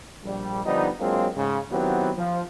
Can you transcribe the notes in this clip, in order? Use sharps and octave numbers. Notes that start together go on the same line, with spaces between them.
A#1 G3
D3 F3 G3 B3 D#4
F#3 G#3 A#3 C4 D4 F4
G#2 C#3
D#3 F#3 B3 C4 E4 G4
F3